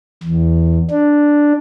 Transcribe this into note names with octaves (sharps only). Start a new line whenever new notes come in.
E2
D4